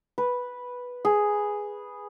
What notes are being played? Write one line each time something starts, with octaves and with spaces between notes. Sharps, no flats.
B4
G#4